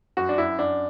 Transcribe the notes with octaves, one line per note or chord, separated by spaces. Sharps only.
F#2 F#4
D4
F#2 E4
F#2 D4